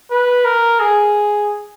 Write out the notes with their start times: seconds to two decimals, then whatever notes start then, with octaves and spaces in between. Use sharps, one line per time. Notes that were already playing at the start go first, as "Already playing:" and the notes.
0.11 B4
0.45 A#4
0.80 G#4